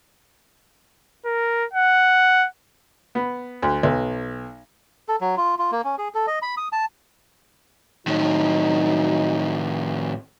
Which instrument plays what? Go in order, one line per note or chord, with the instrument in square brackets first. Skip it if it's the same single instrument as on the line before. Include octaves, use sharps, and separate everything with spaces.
[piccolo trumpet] A#4
F#5
[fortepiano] B3
D2
B1
[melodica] A4
F#3
F4
F4
A#3
C#4
G#4
A4
D#5
B5
D#6
A5
[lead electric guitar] A2 D#3 [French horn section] F#3 D#4